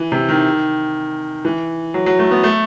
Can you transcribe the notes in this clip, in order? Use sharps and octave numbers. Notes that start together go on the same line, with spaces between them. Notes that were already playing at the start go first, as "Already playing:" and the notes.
Already playing: E3
C3
D#3
E3
F#3
F#3
A3
B3
A3